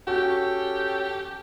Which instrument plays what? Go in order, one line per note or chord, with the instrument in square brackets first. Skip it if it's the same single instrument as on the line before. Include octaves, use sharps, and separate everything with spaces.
[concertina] C#4 A4 G5 [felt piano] F#4 [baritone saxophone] G4